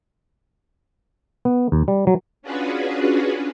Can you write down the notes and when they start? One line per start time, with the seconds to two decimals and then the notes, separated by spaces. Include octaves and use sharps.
1.45 B3
1.72 D#2
1.88 G3
2.07 F#3
2.42 C#4 D4 F4 F#4 G#4 B4